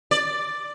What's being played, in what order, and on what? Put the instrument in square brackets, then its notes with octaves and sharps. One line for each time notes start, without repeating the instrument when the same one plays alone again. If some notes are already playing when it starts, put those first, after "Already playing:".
[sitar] D5